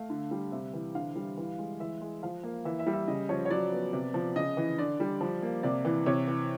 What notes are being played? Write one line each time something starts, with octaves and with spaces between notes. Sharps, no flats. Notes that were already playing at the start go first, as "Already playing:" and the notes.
Already playing: A3 F5
D3
G3
C3 E5
E3
D3 F5
G3
E3
G#3
E3 E5
G#3
F3 F5
A#3
E3 E5
E5
G3
E5
C#3 D#5
F3 C#5
C#5
F#3 D5
B3
C3
F3
C#3 D#5
E3
D3 D5
G3
F3
A#3
C3 D5
E3
C3 C#5
E3